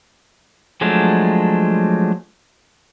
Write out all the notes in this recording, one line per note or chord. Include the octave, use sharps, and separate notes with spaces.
F3 F#3 G#3 A3 D4